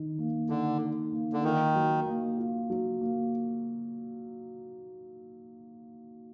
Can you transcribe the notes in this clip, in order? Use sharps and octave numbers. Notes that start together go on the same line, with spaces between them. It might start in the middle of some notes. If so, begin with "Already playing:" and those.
Already playing: D#3 D#4
A#3
D3 D#4
D#4
A#3
D3
D#3 F4
F#3
A#3
F4
F#3
A#3